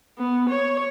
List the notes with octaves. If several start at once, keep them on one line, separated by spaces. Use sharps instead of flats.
B3
C#5